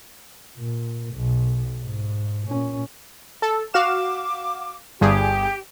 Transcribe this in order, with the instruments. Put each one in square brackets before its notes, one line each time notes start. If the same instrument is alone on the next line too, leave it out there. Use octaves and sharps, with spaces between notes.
[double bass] A#2
B1
G#2
A#2 C#4
[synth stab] A4
[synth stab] F#4 F5 E7 [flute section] D6
[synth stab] G1 G2 G#4 [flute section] G4